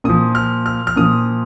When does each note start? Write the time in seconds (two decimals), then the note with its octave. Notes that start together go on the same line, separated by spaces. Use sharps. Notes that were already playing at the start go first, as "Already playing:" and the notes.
0.04 A#2 F3 D#6
0.35 F6
0.66 F6
0.87 F6
0.96 A#2 F3 D#6